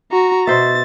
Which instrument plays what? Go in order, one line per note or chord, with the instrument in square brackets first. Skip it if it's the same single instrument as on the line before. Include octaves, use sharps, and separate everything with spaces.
[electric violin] F#4 A#5
[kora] B2 C5 E5 [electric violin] A6